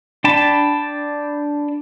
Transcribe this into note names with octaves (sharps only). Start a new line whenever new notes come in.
D4 G5 A5 B5